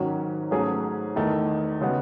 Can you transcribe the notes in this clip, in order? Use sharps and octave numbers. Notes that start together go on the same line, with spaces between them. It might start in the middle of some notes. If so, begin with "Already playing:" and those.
Already playing: G#2 D#3 F#3 C#4 F#4
G#2 F#3 A3 C#4 G#4
E2 D#3 A3 D#4
C#3 G#3 B3 F#4